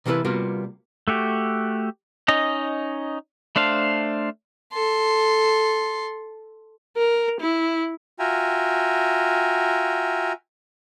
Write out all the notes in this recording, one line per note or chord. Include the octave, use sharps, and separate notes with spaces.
C3 E3 A#3 E4 A4 B4
C3 G3 A#3 B3 F4 F#4
A3 F#4 G4
C#4 D#4 D#5
A3 D4 C5 F5
A4 C6
A#4
E4
F4 F#4 E5 G5 G#5 A#5